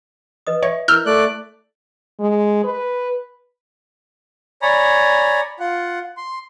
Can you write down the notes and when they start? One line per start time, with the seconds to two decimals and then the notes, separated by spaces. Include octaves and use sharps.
0.47 B4 D#5 D#6
0.63 C#5 E5
0.88 E4 A#4 E6 F6 G6
1.06 A3 D5 F#6
2.20 G#3
2.64 B4
4.62 C#5 D5 G#5 A#5 B5
5.60 F4 F#5
6.17 C6